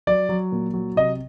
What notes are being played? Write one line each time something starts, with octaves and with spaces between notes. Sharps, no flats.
F#3 D5
F#3
A#2
F#3
C3 D#5